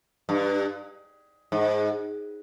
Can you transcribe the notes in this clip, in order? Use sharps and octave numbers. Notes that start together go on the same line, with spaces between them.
G2
G#2